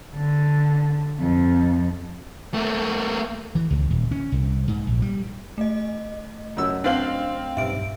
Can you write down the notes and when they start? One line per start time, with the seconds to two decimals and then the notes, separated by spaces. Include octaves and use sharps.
0.15 D3
1.20 F2
2.54 A3 A#3
3.55 E3
3.70 C#2
3.90 D#1
4.11 C#4
4.32 C2
4.68 G#2
4.87 A#1
5.02 G3
5.58 A3 D#5
6.57 F#2 E6
6.84 C4 D4 C5 F5 F#7
7.57 B1 G2 E5 D7